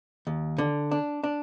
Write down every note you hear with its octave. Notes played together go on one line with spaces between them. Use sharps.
D#2
D3
D4
D4